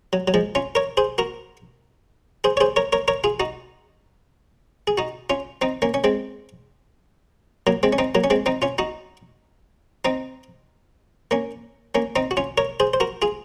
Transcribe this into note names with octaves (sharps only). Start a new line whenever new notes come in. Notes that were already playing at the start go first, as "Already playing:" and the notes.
F#3
F#3
F3 G#3
C#4 F4
A#4 C#5
G#4 C5
F#4 A#4
G#4 C5
C#5
G#4 C5
A#4 C#5
A#4 C#5
A#4 C#5
F4 G#4
D#4 F#4
G#4
D#4 F#4
C#4 F4
C4 D#4
A#3 C#4
C#4
G#3 C4
F#3 A#3
G#3 C4
C#4
C4 D#4
F#3 A#3
C#4
G#3 C4
C4 D#4
C#4 F4
D#4 F#4
C4 D#4
A#3 C#4
A#3 C#4
C4 D#4
F#4
C#4 F4
A#4 C#5
G#4 C5
C5
F#4 A#4
F4 G#4